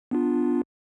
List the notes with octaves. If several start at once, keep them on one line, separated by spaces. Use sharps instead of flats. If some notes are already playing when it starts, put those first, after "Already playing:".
B3 D4 F4